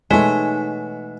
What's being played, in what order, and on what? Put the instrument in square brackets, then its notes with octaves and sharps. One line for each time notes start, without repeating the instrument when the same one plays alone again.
[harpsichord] B2 E3 [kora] G#3 A3 [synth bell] D#4 [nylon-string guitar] C#5 G#5